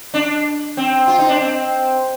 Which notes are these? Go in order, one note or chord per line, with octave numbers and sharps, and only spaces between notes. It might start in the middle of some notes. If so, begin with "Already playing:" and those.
D4
C4
F4
D#4
D4
C4